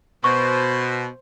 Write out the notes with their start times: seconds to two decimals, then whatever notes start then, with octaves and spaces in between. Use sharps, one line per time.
0.24 B2 C5 C#6